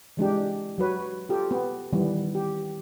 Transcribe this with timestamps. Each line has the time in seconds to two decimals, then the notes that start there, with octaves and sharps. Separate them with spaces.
0.17 E3 G#3 D4 G4
0.78 F#3 F#4 B4 C#5
1.29 F4 G4 A4
1.51 B3
1.93 D#3 E3 G3 B3
2.35 G4